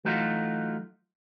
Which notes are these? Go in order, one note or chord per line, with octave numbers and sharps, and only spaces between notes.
E3 F#3 A3 D#4 F4 F#4